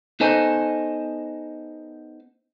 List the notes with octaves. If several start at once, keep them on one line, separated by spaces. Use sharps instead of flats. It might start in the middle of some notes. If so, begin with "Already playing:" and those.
B3 D#4 A4 C5 D#5 G#5